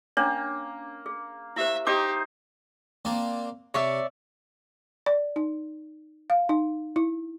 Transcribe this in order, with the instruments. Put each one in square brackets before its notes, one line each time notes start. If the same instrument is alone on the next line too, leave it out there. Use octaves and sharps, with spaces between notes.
[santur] A#3 [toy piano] C#4 D4 C#5
[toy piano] G#4
[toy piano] E4 G4 C5 [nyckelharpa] E5
[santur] D#4 C5 D#5 [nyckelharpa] G4 [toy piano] D6
[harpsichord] A#3 C4 D4
[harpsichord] C3 [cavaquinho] C#5 D5 E5
[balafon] D5
D#4
F5
D#4
E4